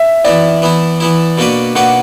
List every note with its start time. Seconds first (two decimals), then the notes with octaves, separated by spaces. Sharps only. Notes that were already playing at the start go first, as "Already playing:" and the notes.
Already playing: E5
0.25 E3 B3 E4 D5
0.62 E3 B3 E4
1.00 E3 B3 E4
1.38 B2 A#3 D4 F#4 B4
1.75 B2 A#3 D4 F#4 B4 F#5